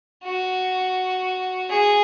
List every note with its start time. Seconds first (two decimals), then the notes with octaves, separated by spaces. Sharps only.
0.24 F#4
1.70 G#4